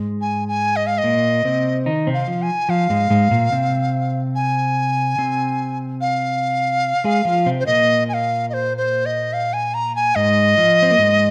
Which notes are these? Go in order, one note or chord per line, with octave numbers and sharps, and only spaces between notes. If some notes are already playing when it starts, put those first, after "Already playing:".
Already playing: G#2 G#3
G#5
G#5
D#5
F5
D#5
A#2 A#3
C3 C4
D#3 D#4
C3 C4
F5
F3
G#5
F3 F5
G#2 G#3
G#2 G#3
A#2 A#3
C3 C4
G#5
C3 C4
F5
G#3 G#4
F3 F4
C3 C4
C5
A#2 A#3 D#5
G#5
F5
D#5
C5
C5
D#5
F5
G#5
A#5
G#5
G#2 G#3 D#5
F3
C4
A#3
G#2 G#3